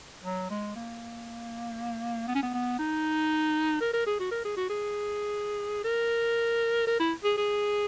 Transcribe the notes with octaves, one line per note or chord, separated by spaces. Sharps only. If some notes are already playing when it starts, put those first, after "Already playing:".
F#3
G#3
A#3
B3
C#4
B3
B3
D#4
A#4
A#4
G#4
F#4
A#4
G#4
F#4
G#4
A#4
A#4
E4
G#4
G#4